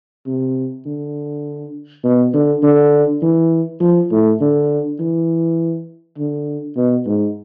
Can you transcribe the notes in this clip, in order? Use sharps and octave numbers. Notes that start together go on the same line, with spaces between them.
C3
D3
B2
D3
D3
E3
F3
A2
D3
E3
D3
B2
G#2